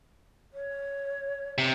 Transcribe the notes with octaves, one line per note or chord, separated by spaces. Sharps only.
C#5
C3